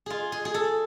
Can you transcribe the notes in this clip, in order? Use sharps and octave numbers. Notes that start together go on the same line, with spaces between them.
F4 G#4
G#4
G#4
A4